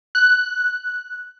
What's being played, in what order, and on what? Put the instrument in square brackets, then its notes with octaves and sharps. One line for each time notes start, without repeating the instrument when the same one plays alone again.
[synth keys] F#6